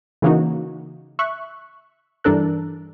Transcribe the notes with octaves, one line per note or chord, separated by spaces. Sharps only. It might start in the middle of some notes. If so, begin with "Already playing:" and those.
C#3 E3 A#3 C#4 D#4 F#4
E5 C#6 F#6
G2 E3 D4 A4 A#4 F#6